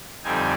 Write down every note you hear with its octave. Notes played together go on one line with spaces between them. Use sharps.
F2 D3 G3 C4 D#4 G#5